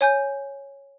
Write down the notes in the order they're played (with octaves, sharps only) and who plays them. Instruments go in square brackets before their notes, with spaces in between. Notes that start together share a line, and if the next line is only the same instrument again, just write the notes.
[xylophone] C#5 G#5 G6